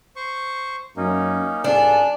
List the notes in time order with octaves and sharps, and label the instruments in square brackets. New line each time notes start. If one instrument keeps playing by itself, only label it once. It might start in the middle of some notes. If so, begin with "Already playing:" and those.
[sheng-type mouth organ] C5 C#6
[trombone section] F#2 [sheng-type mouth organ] A#3 C#4 D#4
[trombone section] C#2 G#2 G3 [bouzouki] D4 [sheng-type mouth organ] F4 A4 [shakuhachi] G#5